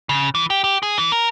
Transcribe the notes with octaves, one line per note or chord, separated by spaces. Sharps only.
C#3
E3
G4
G4
G#4
E3
A#4